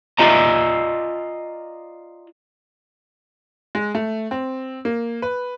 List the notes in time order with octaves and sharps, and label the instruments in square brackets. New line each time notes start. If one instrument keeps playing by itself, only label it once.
[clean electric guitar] F4 D5 D#5 G#5 A#5
[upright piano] G#3
A3
C4
A#3
B4